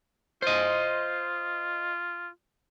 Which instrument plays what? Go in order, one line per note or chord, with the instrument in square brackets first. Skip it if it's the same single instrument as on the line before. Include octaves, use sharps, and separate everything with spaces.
[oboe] F4 [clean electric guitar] C5 D#5